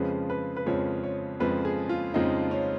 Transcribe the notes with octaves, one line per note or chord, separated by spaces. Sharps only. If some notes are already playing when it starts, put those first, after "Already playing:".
Already playing: F2 C#3 F3 G#3 B4
B4
B4
F2 C#3 F3 G#3 C#5
C#5
F2 C#3 F3 G#3 B4
G#4
F4
F2 C#3 F3 G#3 D#4
C#4